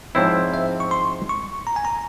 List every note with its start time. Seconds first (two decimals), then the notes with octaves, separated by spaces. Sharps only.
0.15 G#2 F3 C4 E4 C#5
0.54 E5
0.80 C#6
0.91 C6
1.29 C#6
1.67 A#5
1.76 G#5
1.85 A#5